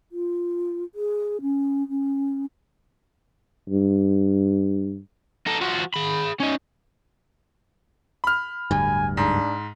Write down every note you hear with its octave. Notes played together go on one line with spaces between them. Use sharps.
F4
G#4
C#4
C#4
G2
D#4 A4
F3 F#4
G#4 B5
C#4 D#4
B5 F6
D1 D2 G2 G#5
G#2 D4